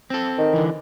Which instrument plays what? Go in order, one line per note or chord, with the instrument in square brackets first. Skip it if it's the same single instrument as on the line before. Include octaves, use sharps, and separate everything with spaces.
[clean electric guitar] C4 A4
[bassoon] D#3
[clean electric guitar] D3 E3